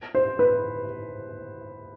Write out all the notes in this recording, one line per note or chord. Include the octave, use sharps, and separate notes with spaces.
C5
B4